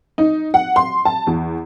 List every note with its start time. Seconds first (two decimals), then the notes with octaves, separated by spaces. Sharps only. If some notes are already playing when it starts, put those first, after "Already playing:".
0.18 D#4
0.54 F#5
0.76 C6
1.05 A5
1.27 E2